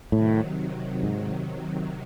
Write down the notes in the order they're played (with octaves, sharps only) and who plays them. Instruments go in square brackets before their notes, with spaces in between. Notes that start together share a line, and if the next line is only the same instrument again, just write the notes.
[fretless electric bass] A2 [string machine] C3 D#3 F#3
[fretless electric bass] G#2